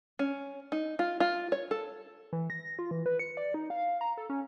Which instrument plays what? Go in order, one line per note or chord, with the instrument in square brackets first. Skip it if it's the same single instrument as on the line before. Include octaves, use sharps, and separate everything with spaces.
[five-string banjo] C#4
D#4
F4
F4
C#5
A4
[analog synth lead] E3
A#6
F4
E3
B4
C#7
D5
D#4
F5
A#5
A4
C#4